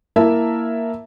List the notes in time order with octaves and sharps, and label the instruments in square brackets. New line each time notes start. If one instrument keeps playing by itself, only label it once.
[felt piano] A#3 E4 A#4 E5 A5